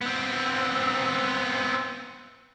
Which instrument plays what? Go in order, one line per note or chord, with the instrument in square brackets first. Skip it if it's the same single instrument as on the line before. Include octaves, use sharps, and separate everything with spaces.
[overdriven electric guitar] B3 C4